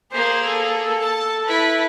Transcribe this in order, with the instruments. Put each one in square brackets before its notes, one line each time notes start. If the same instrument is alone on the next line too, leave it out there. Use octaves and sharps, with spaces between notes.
[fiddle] A#3 G#4 [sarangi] C5
[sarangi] A4
[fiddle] A5
E4 B4